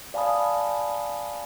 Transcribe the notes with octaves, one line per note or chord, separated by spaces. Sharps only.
D5 F5 G#5 A5 B5 D#6